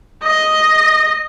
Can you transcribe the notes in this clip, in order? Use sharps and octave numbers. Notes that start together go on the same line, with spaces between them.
D#5